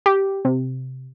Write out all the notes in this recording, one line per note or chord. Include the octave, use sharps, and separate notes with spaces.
G4
C3